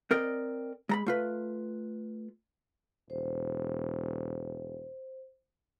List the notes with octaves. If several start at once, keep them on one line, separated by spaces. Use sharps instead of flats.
C4 A#4 D5 D#5
G#3 A#5 B5
A3 F4 B4
E1 C5